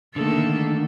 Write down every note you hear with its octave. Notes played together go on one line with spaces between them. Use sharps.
D3 D#3 A3 A#3 A4